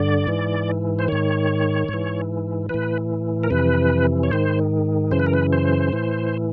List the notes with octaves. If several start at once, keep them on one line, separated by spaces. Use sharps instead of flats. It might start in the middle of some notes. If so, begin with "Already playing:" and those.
Already playing: G2 D3 D5
G#2 E3
C5
G#2 D#3 C#5
G#2 E3
A2 E3 B4
A#4
F2 C3 E3 B4
C#5
G#2 D#3 C5
F#2 C#3 E3 C5
B4
A#4
B4
C5
A2 E3